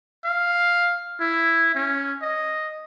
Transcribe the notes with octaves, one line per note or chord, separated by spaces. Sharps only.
F5
E4
C#4
D#5